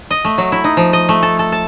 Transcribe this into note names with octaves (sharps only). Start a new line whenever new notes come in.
D#5
A3
F#3
E4
D#4
F3
D#5
A3
A4
A4
A5